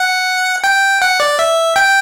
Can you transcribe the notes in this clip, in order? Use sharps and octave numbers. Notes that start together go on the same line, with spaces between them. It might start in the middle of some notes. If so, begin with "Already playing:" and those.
Already playing: F#5
G5
F#5
D5
E5
G5